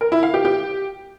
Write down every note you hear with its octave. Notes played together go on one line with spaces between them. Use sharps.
A#4
E4
F5
G4
G4